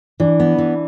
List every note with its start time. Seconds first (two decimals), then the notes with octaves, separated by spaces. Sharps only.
0.20 E3 D4
0.40 B3
0.58 E3